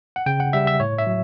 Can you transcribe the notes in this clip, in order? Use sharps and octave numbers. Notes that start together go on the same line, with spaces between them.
F#5
C#3 G5
F#5
G3 E5
E5
A2 C#5
E5
F#3